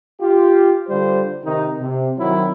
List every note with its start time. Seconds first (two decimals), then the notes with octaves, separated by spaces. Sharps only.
0.21 F4 G4
0.89 D3 G3 F4 C5
1.44 C3 D#3 D#4
1.79 C3
2.19 D#3 F#3 C4 E4